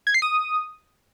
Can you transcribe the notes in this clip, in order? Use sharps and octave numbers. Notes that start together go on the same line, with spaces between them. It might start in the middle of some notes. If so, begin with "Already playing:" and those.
G#6
C7
D#6